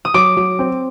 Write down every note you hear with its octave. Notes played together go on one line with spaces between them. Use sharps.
D#6
F#3 D6
F#3
C4